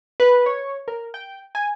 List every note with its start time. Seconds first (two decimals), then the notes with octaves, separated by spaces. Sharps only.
0.20 B4
0.46 C#5
0.88 A#4
1.14 G5
1.55 G#5